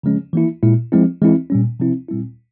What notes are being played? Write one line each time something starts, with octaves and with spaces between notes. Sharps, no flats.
C#3 F3 G#3 C#4
E3 A#3 E4
A#2 G#3 E4
F3 G#3 C4 E4
E3 G#3 C4 E4
A#2 G3 C#4
C3 F3 C4 E4
A#2 G3 C4 E4